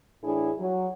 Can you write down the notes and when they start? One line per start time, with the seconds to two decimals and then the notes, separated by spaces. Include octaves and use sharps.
0.23 A2 E3 D4 E4 G#4
0.59 F#3